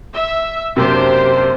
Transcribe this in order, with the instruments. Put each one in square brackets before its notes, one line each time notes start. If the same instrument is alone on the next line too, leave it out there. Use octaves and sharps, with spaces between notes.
[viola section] E5
[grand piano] F#2 C3 A#3 [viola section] D4 G4 C5